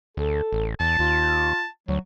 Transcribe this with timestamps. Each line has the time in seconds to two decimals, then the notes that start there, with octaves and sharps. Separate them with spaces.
0.17 D2 A4
0.53 A1
0.80 E2 A5
0.99 D#2 F4
1.88 D2 F#3